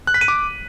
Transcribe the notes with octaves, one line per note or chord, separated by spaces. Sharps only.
F#6
B6
D#7
D6